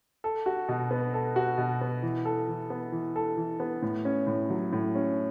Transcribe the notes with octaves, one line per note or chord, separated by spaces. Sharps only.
A4
F#4
B2
B3
A4
F#4
B2
B3
E3
A4
E3
B3
E3
A4
E3
B3
A2
C#4
A2
F#3
A2
C#4